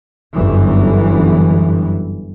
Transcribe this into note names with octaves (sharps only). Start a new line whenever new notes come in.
G1 F#2 E3